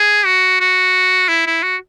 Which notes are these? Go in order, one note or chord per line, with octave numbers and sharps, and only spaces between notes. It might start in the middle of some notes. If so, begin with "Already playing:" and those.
Already playing: G#4
F#4
F#4
E4
E4
F#4